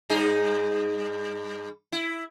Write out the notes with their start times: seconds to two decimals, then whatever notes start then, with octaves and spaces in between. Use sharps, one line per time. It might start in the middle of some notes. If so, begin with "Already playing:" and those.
0.09 G2 D#4 G#4
1.92 E4